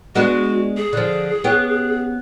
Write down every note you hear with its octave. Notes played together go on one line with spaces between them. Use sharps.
G#3 B3 D4 F#4
G#4
D3 F3
B3 C#4 G4